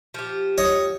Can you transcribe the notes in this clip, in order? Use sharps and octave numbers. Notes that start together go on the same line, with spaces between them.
F3 G4
C#5 D#5